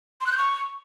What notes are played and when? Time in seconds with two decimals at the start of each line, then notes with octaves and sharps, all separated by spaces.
0.21 C6
0.26 F#6
0.32 G6
0.38 C#6